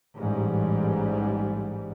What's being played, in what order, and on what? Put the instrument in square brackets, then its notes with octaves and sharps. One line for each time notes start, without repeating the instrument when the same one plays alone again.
[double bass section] A1 G#2 G3